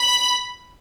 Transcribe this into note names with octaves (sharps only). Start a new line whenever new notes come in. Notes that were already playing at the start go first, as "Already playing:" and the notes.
Already playing: B5